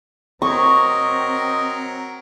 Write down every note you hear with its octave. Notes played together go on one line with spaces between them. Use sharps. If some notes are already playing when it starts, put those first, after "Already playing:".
F#3 C4 A#4 D#5 C#6